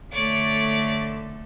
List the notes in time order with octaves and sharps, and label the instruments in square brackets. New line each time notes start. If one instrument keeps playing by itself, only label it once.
[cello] D3 A3 [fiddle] C#5 D5